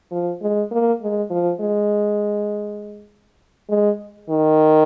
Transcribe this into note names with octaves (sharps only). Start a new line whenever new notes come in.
F3
G#3
A#3
G#3
F3
G#3
G#3
D#3